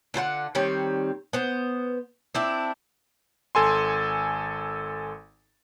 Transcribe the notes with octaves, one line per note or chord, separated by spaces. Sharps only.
D3 F4 B4 F#5
D#3 G3 C4 C#5
B3 C5
C4 D4 E4
G#1 A4 G#5 C6